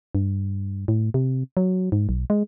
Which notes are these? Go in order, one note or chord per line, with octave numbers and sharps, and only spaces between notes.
G2
A2
C3
F#3
G#2
B1
G#3